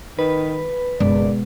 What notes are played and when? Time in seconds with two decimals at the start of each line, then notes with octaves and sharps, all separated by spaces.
0.19 D#3 B4
1.00 F#1 B2 G#3 B3 D5